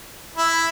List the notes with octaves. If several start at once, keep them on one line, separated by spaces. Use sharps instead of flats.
E4